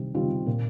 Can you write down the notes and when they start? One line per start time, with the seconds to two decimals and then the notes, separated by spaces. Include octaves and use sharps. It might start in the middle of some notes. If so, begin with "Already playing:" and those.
Already playing: C3 D#3 G3 C4
0.14 D#3 G3 C4 F4
0.46 A#2